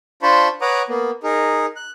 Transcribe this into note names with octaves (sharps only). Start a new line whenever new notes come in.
D4 F4 C5 A5 B5 C#6
B4 C#5 F#5 A#5 D6 D#6
A#3 B3
D#4 G#4 A#4
F#6